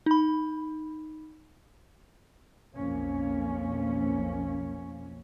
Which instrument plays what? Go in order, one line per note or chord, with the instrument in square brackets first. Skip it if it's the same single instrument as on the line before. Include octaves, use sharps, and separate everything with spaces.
[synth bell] D#4 B5
[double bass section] B1 F2 A#3 C#4